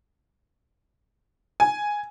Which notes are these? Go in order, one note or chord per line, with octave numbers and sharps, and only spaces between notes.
G#5